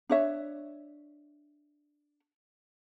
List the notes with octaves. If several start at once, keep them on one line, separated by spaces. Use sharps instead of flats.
D4 C#5 E5